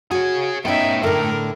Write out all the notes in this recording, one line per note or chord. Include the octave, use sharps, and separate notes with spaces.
F#4 G#4 C#5
A3 B3 C#4 D#4 E5 G5
A2 D3 A#4